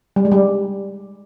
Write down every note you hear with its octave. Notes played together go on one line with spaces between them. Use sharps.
G3
G#3
G3